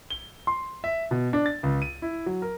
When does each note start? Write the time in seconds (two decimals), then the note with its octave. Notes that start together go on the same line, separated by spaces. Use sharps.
0.10 G7
0.47 C6
0.84 E5
1.11 B2
1.33 D4
1.46 A6
1.63 C#2
1.82 D#7
2.02 E4
2.26 F#3
2.42 A#4